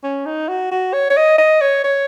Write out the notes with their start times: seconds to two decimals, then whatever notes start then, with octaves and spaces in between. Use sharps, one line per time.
0.04 C#4
0.26 D#4
0.49 F#4
0.71 F#4
0.93 C#5
1.10 C#5
1.17 D#5
1.38 D#5
1.61 C#5
1.84 C#5